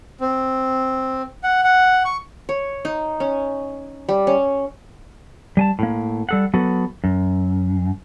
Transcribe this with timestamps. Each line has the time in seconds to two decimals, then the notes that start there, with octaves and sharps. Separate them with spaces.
0.21 C4
1.44 F#5
1.64 F#5
2.05 C#6
2.49 C#5
2.85 D#4
3.20 C#4
4.09 G3
4.27 C#4
5.57 G3 G#5 A5
5.79 A2 A#3
6.29 G3 A4 F#5
6.54 F#3 B3 F#4 A4
7.04 F#2